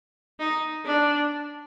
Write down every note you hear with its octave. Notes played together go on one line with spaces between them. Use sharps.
D#4
D4